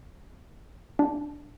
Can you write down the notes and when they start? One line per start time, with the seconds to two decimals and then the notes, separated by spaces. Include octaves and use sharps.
0.99 D4